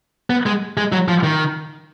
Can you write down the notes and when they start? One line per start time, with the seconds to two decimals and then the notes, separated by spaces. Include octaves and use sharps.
0.30 B3
0.46 G#3
0.77 G#3
0.92 F#3
1.08 F3
1.24 D#3